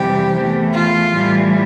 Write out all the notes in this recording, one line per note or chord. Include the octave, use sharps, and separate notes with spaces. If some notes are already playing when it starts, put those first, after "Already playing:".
Already playing: F2 C3 E3 G3 G4
E2 E3 A3
F4
A2 E3 G3